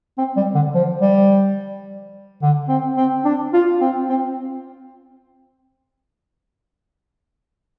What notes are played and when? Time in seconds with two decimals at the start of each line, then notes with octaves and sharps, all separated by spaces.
0.18 C4
0.37 G3
0.55 D3
0.74 F3
1.01 G3
2.42 D3
2.69 C4
2.97 C4
3.25 D4
3.53 F4
3.81 C4
4.09 C4